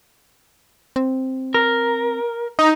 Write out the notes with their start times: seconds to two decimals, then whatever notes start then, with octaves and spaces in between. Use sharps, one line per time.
0.96 C4
1.54 A#4
2.59 D#4